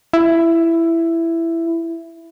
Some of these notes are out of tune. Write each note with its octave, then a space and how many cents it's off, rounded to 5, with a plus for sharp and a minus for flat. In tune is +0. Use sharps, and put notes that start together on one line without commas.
E4 +10